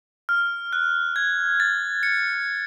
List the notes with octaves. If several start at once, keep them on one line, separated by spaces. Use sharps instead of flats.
F6
F#6
G#6
A6
C#7